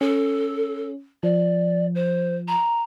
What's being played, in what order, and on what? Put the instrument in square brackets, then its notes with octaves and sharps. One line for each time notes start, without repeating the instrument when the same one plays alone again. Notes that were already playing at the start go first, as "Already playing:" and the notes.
[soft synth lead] C#4 [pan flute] A4
[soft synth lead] F3 [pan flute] D5
[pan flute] C5
A#5